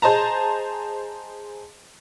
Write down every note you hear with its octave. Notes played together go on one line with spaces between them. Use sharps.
G#4 C5 D#5 A5 A#5